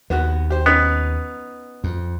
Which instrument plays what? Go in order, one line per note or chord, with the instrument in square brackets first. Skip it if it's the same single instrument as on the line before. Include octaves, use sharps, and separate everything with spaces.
[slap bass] D#2 [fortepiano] B3 F#4 F#6
[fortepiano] G4 C5
[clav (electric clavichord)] B3 [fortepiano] C#4 D#4 B4
[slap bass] F2